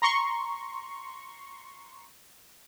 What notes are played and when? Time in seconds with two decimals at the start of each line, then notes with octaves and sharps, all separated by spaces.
0.02 A#5 C6 C#6